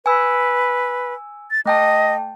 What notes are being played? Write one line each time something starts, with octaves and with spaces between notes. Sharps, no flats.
B4 G#5 E6
A6
A3 D#5 G5 A5